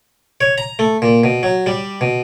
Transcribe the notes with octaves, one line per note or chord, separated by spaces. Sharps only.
C#5
A#5
A3
A#2
B2
F#3
G3
B2